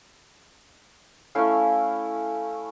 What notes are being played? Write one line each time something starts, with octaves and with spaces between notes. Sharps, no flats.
A3 C#4 E4 F5